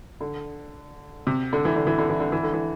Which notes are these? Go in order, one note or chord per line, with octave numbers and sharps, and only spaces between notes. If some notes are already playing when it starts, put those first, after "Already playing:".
D3
C3
D3
E3
D3
E3
D3
E3
D3
E3
D3
E3